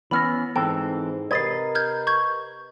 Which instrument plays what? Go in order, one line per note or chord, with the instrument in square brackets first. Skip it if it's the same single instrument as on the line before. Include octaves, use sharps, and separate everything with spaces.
[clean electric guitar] E3 B3 C#4 [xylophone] B5 F6 A#6
[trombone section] G#2 G#3 [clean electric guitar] E3 C4 A4 [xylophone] G5
[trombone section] C3 A#4 [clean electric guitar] B4 D#5 [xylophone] G#6 A6 C7
[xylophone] F6 G6 G#6
C#6 G6 G#6